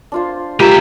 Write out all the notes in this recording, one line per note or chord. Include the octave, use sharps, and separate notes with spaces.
D4 F4 C5
G#3 A#3 F4 G4 E5 G5 A#5